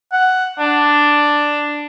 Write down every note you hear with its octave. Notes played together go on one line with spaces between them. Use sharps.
F#5
D4